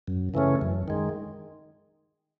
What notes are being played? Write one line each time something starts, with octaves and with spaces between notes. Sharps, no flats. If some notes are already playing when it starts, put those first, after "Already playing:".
F#2
C#3 E3 A3 C#4
F#2
D#3 G#3